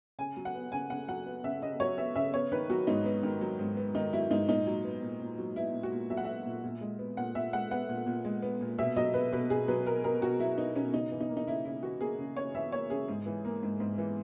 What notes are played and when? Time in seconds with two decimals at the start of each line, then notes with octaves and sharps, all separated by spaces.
0.19 C#3 G#5
0.37 F#3
0.45 F#5
0.55 B3
0.72 C#3 G#5
0.90 C#3 F#5
1.08 F#3 F#5
1.26 B3
1.44 C#3 E5
1.62 C#3 D#5
1.80 F#3 C#5
1.98 B3 E5
2.16 C#3 E5
2.34 B3 C#5
2.52 D#3 B4
2.70 F#3 F#4
2.87 G#2 D#4
3.05 B3
3.23 D#3
3.41 F#3
3.59 G#2
3.77 B3
3.95 D#3 D#4
4.13 F#3 E4
4.30 G#2 D#4
4.48 A#2 D#4
4.67 F#3
4.85 B3
5.03 A#2
5.20 A#2
5.38 F#3
5.56 B3 E4
5.74 A#2
5.83 F#4
5.92 A#2
6.10 F#3 E5
6.17 F#5
6.25 B3 E5
6.46 A#2
6.64 A#2
6.81 G#3
6.99 B3
7.17 A#2 F#5
7.35 A#2 E5
7.53 G#3 F#5
7.71 B3 F#5
7.89 A#2
8.07 A#2
8.25 G#3
8.42 B3
8.61 A#2
8.78 B2 E5
8.96 F#3 D#5
9.14 B3 B4
9.33 B2 B4
9.50 B2 G#4
9.68 F#3 B4
9.86 B3 A#4
10.04 B2 A#4
10.22 B2 F#4
10.39 F#3 E4
10.58 B3 D#4
10.76 B2 C#4
10.94 C#3 D#4
11.11 E3
11.21 D#4
11.29 A#3
11.37 D#4
11.47 C#3 E4
11.65 C#3 E4
11.83 E3 F#4
12.01 A#3 G#4
12.19 C#3
12.36 C#3 C#5
12.54 E3 E5
12.72 A#3 C#5
12.90 C#3 G#4
13.08 G#2
13.26 E3
13.45 A#3
13.63 G#2
13.80 G#2
13.98 E3